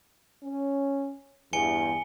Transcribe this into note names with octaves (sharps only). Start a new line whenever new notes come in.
C#4
E2 G2 G#5 C#7 G7